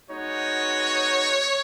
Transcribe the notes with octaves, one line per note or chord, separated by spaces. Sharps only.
G#3 B3 D#4 F#4 C#5